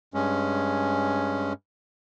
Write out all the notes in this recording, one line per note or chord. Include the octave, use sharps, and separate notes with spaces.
G2 G#3 C#4